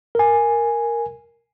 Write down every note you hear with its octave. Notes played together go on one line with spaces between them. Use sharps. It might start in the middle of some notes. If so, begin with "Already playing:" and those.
A#4 G#5